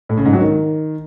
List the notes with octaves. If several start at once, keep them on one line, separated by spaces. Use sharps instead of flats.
A2
C#3
G#2
F#3
D#3